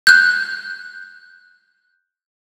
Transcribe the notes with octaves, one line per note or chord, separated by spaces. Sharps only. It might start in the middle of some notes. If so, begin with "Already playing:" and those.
F#6 G6